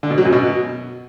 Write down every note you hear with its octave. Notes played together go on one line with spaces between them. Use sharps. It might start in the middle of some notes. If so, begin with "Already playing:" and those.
D3
B2
F#3
F#2
B2